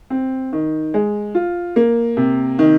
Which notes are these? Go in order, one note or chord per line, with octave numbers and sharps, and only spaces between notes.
C4
D#3
G#3
F4
A#3
C3
D#3